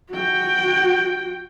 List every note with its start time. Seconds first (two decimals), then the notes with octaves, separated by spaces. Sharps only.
0.10 F#4 G5